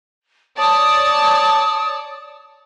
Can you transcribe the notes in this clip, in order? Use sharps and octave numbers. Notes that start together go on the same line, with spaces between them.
C#5 D5 A5 D#6